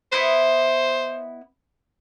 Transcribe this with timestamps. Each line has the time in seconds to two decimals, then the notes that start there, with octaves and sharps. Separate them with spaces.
0.12 B3 E4 C5 D#5